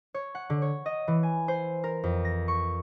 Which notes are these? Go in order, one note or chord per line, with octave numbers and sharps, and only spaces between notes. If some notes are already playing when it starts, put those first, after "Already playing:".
C#5
F#5
D3
C#5
D#5
E3
G#5
C5
A#4
F2
A#6
C#6